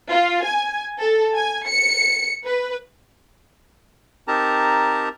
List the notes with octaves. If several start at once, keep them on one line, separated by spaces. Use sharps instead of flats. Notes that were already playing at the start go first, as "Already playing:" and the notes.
F4
G#5
A4
G#5
C#7
B4
C4 D#4 G4 A#4 A5 A#5